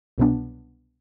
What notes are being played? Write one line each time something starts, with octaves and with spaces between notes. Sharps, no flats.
C2 B2 F#3 B3 D4